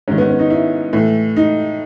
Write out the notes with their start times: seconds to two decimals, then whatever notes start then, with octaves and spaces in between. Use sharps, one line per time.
0.08 G#2 D#3 C#4
0.18 B3
0.29 C#4
0.39 D#4
0.50 E4
0.93 A2 E3 E4
1.37 D#4